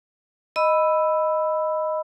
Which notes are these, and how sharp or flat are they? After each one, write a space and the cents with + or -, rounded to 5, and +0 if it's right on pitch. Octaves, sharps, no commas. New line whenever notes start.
D#5 +0 B5 +0 E6 +0